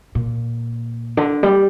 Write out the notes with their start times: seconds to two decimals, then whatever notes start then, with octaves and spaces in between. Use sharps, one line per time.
0.15 A#2
1.17 D3
1.43 G3